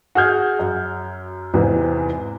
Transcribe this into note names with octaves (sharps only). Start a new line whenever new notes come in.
F#4 G#4 F6 G6 G#6
F#2
E2 G#2 C3 E3